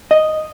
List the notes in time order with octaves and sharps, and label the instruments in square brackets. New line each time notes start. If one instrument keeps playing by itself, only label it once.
[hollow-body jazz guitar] D#5